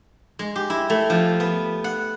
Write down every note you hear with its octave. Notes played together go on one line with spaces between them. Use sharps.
G#3
G4
E4
A3
F3
B3
F#5